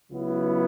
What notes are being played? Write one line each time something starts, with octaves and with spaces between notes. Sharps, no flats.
C#2 C#3 F#3 B3 E4